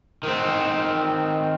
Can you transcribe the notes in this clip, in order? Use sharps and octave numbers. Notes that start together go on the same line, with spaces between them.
D#3 C4